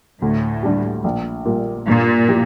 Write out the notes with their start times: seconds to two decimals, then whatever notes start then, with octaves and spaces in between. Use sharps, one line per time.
0.22 D2 A2
0.63 D3 G3 D4 G4
1.04 A#1
1.45 A#2 G3
1.87 G2 A#2
2.28 F3 A#3 E4 G4